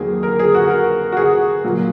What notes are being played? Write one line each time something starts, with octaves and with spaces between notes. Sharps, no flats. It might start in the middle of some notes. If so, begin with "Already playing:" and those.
Already playing: F2 D#3 F#3 A#3 G#4
A#4
G#4
F#4
A#4
F#4
G#4
A#2 F#3 A#3